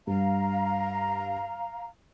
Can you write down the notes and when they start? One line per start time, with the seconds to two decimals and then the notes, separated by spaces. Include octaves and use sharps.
0.07 G2 F5 A#5